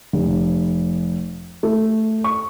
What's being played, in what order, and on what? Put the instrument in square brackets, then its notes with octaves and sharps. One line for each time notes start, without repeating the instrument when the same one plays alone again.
[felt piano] F1
A3
C#6